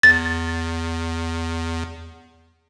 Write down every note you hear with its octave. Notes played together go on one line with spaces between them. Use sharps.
E2 A6